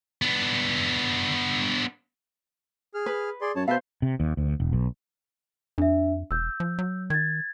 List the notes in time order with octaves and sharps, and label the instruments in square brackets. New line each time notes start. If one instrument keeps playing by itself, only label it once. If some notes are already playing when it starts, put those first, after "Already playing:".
[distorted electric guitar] B3 D4
[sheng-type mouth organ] G#4 F6
[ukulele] B4
[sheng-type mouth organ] G#4 D5 C6
[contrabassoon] F#2 [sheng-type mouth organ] C#5 A5
[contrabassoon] B2 [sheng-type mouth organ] B4 E5 A5 [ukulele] C5 F5
[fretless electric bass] C3
D#2
D2
E1
B1
[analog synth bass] F2 [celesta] D4 E5
[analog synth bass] E1 [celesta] E6 G6
[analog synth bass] F3
F#3
[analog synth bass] D#3 [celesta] G#6 A6